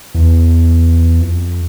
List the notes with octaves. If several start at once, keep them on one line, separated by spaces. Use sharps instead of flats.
E2
F2